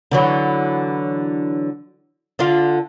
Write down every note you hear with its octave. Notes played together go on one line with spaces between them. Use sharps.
D3 E3 F#3
D3 D4 F4